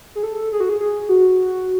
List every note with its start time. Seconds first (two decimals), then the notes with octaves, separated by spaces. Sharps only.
0.15 G#4
0.23 A4
0.52 G#4
0.60 F#4
0.69 G#4
0.80 G#4
1.09 F#4